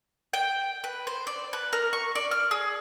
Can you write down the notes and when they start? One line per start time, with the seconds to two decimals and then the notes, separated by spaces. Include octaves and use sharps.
0.33 G5
0.84 B4
1.07 C5
1.27 D5
1.53 B4
1.73 A#4
1.93 C#6
2.15 D5
2.31 F6
2.51 G#4